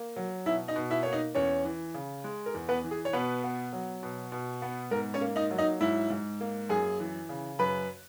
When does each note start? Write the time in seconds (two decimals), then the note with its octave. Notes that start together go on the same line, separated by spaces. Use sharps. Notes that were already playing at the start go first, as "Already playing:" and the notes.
Already playing: A#3
0.16 F#3
0.46 B2 E4 E5
0.68 D#4 D#5
0.76 B2
0.91 E4 E5
1.03 A#3 C#5
1.13 D#4 D#5
1.35 E2 C#4 C#5
1.65 E3
1.94 C#3
2.24 G#3
2.46 A#4
2.54 E2
2.69 B3 B4
2.84 E3
2.91 G#4
3.05 C#5
3.13 B2 B3 B4
3.44 B3
3.73 F#3
4.03 B2
4.32 B2
4.62 B3
4.91 G#2 A#4
5.14 C#4 C#5
5.21 A#3
5.36 D#4 D#5
5.51 F#3
5.58 D#4 D#5
5.81 G#2 E4 E5
6.10 G#2
6.40 A#3
6.69 F#2 G#4 G#5
7.00 E3
7.29 C#3
7.59 F#2 B4 B5